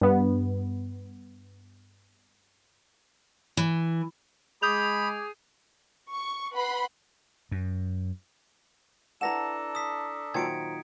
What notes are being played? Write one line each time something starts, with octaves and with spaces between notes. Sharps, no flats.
G2 B3
E3
G#3 G#4 B5 D6 D#6 G6 F7
C#6
B4 F#5 B5 C6
F#2
D4 E4 A4 B4 F#5 A#5 A#6 E7
D#6 B6
A#2 D#3 F#3 C5 A#5 G#6 C#7 D7